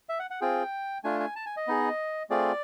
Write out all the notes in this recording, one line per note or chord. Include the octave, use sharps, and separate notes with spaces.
E5
F#5
F#5
C4 F4 G#4 G5
A3 D4 F4 G#5
G#5
A5
G#5
D#5
B3 D#4 G#4
A3 C4 F4 G#4 D5